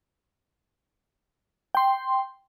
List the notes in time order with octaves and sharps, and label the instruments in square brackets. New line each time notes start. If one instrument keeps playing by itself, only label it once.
[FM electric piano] G5 C6